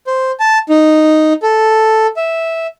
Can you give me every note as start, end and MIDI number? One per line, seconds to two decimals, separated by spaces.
0.07 0.31 72
0.40 0.59 81
0.69 1.33 63
1.43 2.07 69
2.16 2.67 76